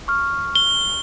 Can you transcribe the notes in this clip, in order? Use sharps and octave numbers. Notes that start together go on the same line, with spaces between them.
C#6 F6
G7